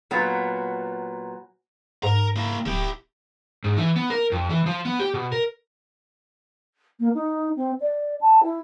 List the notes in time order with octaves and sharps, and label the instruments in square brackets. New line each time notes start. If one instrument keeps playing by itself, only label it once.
[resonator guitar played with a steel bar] A#2 F#3 B3
[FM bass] G#2 [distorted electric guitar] A#4 A#5
[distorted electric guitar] A#3 E4
[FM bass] D1 [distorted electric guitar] E4 G4
[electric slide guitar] G#2
E3
B3
A#4
F2
E3
F3
B3
G4
B2
A#4
[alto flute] A#3
D#4
C4
D5
A5
E4